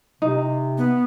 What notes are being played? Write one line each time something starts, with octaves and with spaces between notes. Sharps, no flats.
C3 D#4
B3